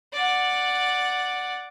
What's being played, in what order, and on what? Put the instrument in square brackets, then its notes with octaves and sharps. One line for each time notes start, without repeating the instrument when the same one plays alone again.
[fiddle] D5 F#5